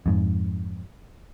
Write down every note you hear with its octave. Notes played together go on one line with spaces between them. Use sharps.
F2 G#2